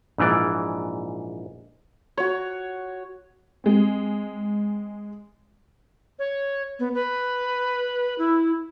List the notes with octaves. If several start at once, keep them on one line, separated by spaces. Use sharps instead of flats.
A#1 G#2 E3 D5
F#4 C#5
G#3 C4
C#5
B3
B4
E4